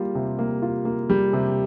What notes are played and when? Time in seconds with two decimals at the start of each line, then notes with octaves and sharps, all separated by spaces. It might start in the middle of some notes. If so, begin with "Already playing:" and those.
Already playing: G3 A#3 F4
0.15 C3
0.39 A#3
0.62 F4
0.85 A#3
1.10 G3
1.33 C3